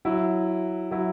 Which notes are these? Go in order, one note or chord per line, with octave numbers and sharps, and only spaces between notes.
F#3 E4
F#3 E4